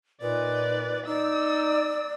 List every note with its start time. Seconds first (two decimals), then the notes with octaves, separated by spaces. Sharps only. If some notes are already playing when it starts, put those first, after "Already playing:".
0.22 A#2 D#4 B4 D5
1.07 D#4 D5 E6